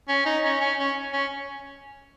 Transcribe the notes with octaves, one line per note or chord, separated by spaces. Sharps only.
C#4
D#4
C#4
C#4
C#4
C#4